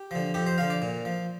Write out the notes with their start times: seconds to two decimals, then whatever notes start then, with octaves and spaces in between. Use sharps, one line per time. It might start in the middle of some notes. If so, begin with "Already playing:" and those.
Already playing: G4
0.11 D3 F3
0.34 F2 G4
0.47 C5
0.58 D3 F3 F5
0.70 D5
0.82 A#2
1.05 F3